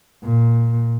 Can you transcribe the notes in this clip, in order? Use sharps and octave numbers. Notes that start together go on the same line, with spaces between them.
A#2